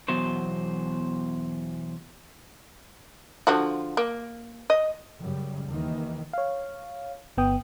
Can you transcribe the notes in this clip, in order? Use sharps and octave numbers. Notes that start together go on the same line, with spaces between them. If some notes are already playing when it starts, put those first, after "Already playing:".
E2 B2 F#3 C5
D3 F3 F#4
A#3
D#5
F#2 C#3 G3
D#2 D#3 E3
C#5 F5
G1 B3 G5 D#6